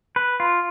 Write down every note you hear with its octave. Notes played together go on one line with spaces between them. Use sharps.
B4
F4